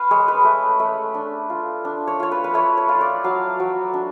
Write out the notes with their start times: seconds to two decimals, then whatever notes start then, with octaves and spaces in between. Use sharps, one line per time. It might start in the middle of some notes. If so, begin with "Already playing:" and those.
Already playing: C#4 B4 F5 B5
0.11 G#3 C#5
0.28 B4
0.45 A3
0.80 A3
1.14 D4
1.50 F4
1.85 D4
2.07 C#5
2.20 F4 C#5
2.32 B4
2.44 B4
2.54 A3 C#5
2.77 C#5
2.89 F4
2.95 F5
3.01 D5
3.24 F#3 F5
3.60 F#3
3.94 D4